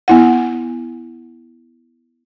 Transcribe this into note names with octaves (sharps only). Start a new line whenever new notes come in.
B3 E4 F#5